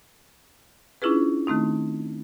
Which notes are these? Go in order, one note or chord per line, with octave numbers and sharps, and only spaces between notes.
C#4 D4 E4 F4 G#4 B4
D#3 A3 C4 D#4